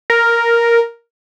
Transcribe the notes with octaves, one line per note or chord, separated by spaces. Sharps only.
A#4